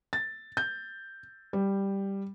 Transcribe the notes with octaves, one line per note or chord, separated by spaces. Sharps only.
A6
G6
G3